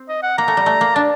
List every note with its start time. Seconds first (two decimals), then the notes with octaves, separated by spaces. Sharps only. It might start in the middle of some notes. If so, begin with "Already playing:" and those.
Already playing: C4
0.09 D#5
0.23 F#5
0.38 A#3 A#5
0.48 A3
0.57 G3
0.66 A3
0.81 A#3
0.95 D4 A5